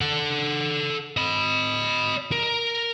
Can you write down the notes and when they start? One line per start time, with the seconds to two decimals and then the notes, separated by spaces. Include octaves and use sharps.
0.01 A4 F#5
1.17 D#5 B5
2.32 A#4